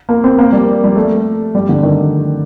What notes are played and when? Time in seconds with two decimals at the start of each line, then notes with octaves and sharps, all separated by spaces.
0.09 A#3
0.24 C4
0.39 A#3
0.52 G3
0.84 G3
0.96 A3
1.55 G3
1.69 D3
1.83 D#3